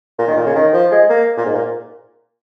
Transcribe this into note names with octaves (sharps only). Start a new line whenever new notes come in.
A#2
D#3
A#2
C#3
D#3
F3
G#3
A#3
A#2
G#2
A#2